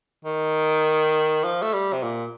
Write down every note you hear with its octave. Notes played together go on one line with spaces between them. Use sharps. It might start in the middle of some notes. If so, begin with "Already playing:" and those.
D#3
F3
A3
G3
C3
A#2